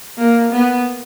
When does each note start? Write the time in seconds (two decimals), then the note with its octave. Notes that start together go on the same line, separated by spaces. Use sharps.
0.18 A#3
0.52 B3